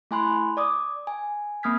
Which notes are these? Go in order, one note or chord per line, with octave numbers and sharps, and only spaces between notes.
A3 E4 G#5 B5 C6 F#6
D5 D6 D#6
G#5
A#3 C4 D#6 F6 G#6 B6